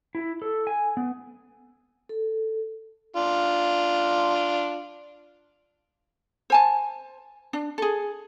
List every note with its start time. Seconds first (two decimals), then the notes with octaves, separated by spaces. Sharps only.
0.15 E4
0.42 A4
0.67 G#5
0.97 B3
2.09 A4
3.16 D4 F4
6.50 C5 G#5 A5
7.53 D4
7.78 G#4 A4